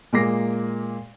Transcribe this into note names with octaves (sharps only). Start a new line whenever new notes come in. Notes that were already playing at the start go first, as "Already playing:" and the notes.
A#2 G#3 A#3 D6 A#6 C7